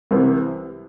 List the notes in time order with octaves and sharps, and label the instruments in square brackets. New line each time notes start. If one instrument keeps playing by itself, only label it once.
[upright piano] C2 C3 E3